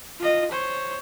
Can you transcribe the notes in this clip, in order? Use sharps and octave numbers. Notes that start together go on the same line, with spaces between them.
F4 D#5
C5 C#5